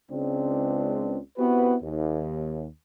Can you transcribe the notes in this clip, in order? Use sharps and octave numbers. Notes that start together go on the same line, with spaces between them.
C#2 C4 D4
B3 C4 E4 F#4 G4 B4
D#2